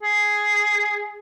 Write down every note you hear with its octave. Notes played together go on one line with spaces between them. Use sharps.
G#4